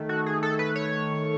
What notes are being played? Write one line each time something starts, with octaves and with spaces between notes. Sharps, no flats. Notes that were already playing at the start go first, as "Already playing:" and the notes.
Already playing: D#3 A3
F#4
G#4
A4
B4
C#5